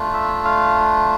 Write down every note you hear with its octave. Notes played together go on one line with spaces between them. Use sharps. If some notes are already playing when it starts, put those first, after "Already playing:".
Already playing: A3 D4 F4
E5
F5